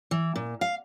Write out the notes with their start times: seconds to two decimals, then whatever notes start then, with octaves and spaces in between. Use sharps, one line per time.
0.11 E3
0.36 A#2
0.61 F5